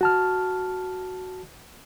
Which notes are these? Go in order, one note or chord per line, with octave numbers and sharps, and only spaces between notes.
F#4 A5 F6